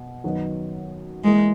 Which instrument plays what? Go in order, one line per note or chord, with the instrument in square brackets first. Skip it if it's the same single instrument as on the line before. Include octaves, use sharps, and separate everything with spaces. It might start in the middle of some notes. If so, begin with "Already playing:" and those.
Already playing: [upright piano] B2
F#2 D#3 F#3 B3 D#4
[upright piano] E3 A#3 E4 G#4 [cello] G#3